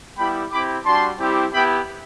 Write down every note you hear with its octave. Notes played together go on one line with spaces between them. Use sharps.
G3 B3 E4 G4 G5 B5
C4 E4 G4 B5 D6
G3 D4 F#4 A5 C6
G3 C4 E4 G4
B3 E4 G4 G5 B5